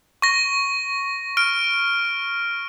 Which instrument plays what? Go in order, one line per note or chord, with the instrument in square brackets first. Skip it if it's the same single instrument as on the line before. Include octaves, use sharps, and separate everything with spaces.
[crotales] C#6 A#6
F6 D7